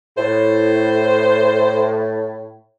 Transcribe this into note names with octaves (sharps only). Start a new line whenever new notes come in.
A2 C5